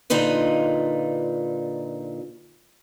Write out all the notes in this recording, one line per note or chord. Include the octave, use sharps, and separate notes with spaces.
A#2 D3 D#4 F4 B4 D#5